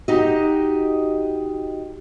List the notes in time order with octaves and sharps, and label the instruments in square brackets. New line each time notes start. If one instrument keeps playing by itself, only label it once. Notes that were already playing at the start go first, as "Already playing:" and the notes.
[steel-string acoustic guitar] D#4 F#4 G4 D#5